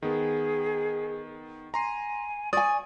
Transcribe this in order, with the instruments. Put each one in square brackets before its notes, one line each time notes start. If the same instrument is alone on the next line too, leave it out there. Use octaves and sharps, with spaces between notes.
[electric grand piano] D#3 B3 [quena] G#4
[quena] G#5 [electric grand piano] A#5 C6 C7
[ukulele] D5 G#5 [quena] C#6 [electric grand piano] D#6